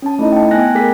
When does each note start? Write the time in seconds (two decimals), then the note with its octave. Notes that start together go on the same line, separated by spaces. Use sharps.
0.02 C#4 A5
0.19 A3 D#4 E4 D#5
0.32 G5 A5
0.51 B3 G5 G#5 F#6 A#6
0.75 A3 G#4 A#4 G#5 B6